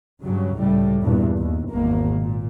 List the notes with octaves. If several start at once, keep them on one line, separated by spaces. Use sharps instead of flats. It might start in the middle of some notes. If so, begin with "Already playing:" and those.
G2 C#3 F#3
C#2 A2 G3
E2 G2 A#2
D#2
G#1 E2 A#3
A#2